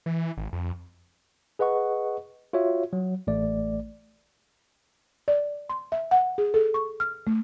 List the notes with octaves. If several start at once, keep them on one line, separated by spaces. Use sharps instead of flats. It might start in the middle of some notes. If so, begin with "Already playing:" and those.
E3
G#1
F2
G#4 B4 D#5 F#5 C#6
F4 F#4 C#5 E5
F#3
A1 A3 D5
D5
C6
E5
F#5
G#4
A4
C#6
F6
A3